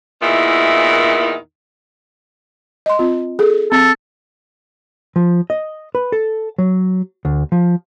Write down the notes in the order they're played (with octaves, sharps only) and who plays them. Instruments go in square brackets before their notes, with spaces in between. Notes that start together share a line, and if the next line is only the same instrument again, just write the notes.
[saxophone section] E2 A#2 D#3 E4
[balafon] D#5 C6
C4 F4
G#4 A4
[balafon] C4 [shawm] A4
[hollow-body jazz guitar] F3
D#5
B4
A4
F#3
D2
F3